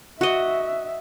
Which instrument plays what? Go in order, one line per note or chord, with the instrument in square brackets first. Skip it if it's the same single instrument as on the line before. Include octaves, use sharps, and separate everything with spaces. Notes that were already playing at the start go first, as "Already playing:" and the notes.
[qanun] F#4 D#5 [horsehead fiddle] E5